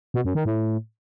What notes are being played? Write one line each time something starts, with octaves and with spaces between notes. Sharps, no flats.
B2
F#2
D#3
A2